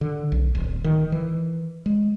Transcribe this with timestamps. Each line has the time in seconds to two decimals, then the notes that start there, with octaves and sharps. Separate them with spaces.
0.01 D3
0.32 B1
0.55 D1
0.84 D#3
1.12 E3
1.86 G#3